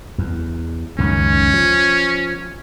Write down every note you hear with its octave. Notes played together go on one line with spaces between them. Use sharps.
E2
C#2 F#2 D#3 C#4
F3